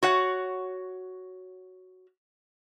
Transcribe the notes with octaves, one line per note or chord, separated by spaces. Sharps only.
F#4 C#5 F#5